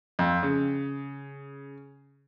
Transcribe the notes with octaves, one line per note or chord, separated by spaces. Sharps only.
F2
C#3